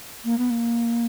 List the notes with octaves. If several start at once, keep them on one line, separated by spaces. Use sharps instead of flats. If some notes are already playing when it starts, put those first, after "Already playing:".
A#3
B3
A#3